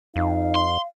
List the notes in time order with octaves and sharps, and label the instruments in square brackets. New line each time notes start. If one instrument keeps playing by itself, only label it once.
[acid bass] F2 [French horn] D#4 [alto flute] F5
[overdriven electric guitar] C6